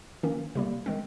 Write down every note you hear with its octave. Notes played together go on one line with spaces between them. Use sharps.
D#3 A#3 C#4
C3 G3 A#3
D#3 G#3 C4